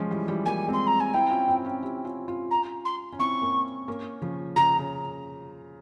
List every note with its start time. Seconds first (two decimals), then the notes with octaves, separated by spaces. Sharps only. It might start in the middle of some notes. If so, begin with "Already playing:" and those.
Already playing: F3 G#3 C#4 F4
0.11 E3 G3
0.28 E3 G3
0.45 G3 A#3 G#5
0.68 G#3 C4 C6
0.87 A#5
1.00 G#5
1.14 C4 E4 G5
1.30 C#4 F4
1.48 C4 E4
1.65 C#4 F4
1.83 E4 G4
2.04 C#4 F4
2.28 C#4 F4
2.51 A#5
2.85 C6
3.13 C#4
3.19 C4 E4 C#6
3.42 A#3 C#4
3.88 A#3 C#4
4.22 C#3 F3
4.56 C#3 A#5
4.79 C#3